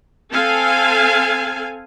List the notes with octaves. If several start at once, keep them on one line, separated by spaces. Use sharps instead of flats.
C4 A4 F5 G#5